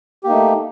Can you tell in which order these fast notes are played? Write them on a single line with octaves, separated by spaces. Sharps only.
G4 A#3 D#4 A3